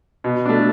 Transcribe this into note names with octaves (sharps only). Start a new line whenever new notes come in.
B2
A3 D4